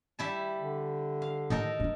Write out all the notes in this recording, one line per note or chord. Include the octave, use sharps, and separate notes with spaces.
G3 E4 A5
D3
F5
A2 D#3 D#4 A4 A#4
A3 D4